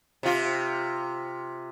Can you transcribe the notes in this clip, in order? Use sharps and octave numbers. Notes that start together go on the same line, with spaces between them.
C3 F4